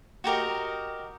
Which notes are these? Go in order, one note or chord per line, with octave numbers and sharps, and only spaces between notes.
F#4 G4 A#4 D#5